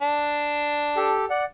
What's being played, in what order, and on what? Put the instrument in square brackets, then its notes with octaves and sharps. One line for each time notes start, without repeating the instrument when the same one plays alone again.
[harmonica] D4
[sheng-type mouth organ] G4 A4
D5 F#5